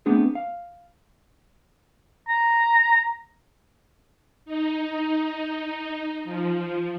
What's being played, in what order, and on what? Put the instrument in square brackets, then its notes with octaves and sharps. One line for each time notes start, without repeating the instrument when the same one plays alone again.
[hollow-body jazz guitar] A3 B3 C4 D4 G#4
F5
[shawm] A#5
[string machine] D#4
F3